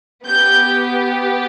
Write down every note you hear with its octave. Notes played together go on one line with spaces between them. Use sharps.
B3 G4 G6